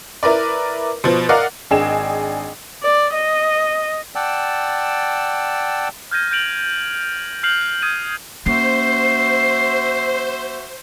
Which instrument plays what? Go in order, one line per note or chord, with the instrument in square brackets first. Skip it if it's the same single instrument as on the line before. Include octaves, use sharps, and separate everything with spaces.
[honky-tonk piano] E4 A#4 B4 D5
B2 F3
A#4 D5 D#5 F5 F#5
G#1 D4 G#4 D#5 G5 E7
[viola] D5
D#5
[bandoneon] D5 F#5 G5 A5 E6
[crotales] F6 G6 G#6 A#6 D#7
G6 A6 D7 F7 F#7
F6 G6 C7 F7 F#7
D#6 F6 G#6 D#7 F#7
[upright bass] A#3 C#4 [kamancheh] F#4 E5 [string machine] C5 [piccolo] C7